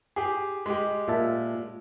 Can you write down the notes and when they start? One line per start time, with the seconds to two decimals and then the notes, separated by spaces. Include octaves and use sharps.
0.16 G4 G#4
0.66 G#3 G4
1.08 A#2 E5 A5